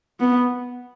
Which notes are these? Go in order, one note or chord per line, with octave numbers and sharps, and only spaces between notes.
B3